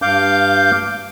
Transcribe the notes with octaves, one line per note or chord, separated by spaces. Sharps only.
G2 F5 D6 G6